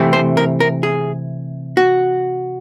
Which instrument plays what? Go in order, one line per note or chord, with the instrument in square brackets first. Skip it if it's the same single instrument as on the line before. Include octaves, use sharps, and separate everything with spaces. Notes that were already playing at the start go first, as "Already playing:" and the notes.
Already playing: [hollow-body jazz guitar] C3 E3 A3 C4
C5
A#4
A#4
G#4
F#4